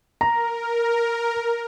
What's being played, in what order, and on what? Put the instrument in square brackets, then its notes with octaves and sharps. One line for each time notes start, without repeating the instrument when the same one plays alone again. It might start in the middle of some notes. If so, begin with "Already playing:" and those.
[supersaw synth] A#4 [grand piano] A#5